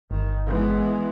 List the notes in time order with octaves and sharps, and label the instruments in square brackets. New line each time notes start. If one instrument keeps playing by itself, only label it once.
[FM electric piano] G1 [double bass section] D#3
[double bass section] E3 G#3 B3